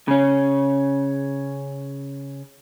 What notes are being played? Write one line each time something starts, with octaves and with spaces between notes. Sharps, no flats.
C#3 C#4